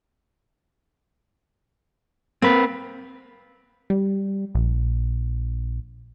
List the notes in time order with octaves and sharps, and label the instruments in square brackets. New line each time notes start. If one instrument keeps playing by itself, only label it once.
[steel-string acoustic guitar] A#3 [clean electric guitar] C4 B4
[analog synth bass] G3
A#1